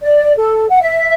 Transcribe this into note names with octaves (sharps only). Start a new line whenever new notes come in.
D5
A4
F#5
E5